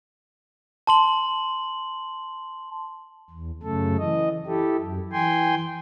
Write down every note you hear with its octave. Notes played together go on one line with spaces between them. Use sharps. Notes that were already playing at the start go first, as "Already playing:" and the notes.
A5 C6 F#7
E2
F#2 C#3 A3 A4
E3 D#5
E4 G4 A4
F#2
E3 G5 G#5 C6